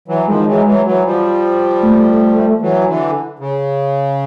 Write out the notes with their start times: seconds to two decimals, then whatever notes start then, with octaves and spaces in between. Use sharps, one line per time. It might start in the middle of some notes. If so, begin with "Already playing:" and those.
0.08 E3 F#3
0.27 D#3 F3 G#3
0.47 E3 F#3
0.66 E3 F#3
0.86 E3 F#3
1.05 F3 G3
1.83 A3
2.61 E3 F#3
2.87 D3 E3
3.39 C#3